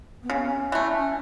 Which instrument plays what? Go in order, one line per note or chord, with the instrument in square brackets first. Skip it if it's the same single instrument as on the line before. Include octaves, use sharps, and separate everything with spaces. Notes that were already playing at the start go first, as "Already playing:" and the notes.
[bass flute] B3
[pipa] C#3 [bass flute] C#4
[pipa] E3 A3